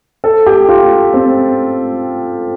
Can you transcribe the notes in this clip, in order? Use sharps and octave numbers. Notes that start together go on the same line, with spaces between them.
A4
G4
F4
C4